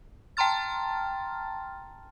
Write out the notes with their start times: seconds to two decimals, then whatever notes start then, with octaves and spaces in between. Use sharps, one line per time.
0.37 G5 A5 A#5 C6 F6 A6